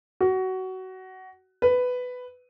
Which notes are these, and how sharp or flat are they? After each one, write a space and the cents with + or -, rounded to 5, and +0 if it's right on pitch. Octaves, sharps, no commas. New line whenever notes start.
F#4 +20
B4 +10